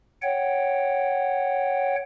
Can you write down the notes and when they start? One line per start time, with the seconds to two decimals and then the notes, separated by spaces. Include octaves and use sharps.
0.22 C#5 F#5 G5